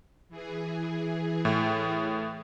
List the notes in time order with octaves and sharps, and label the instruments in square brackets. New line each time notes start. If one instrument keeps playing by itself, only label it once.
[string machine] E3 G#4
[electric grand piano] A2